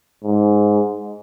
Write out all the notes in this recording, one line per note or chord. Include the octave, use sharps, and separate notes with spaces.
G#2